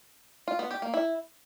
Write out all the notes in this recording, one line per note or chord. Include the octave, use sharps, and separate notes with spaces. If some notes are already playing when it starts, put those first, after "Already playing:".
F4
B3
G4
A#3
E4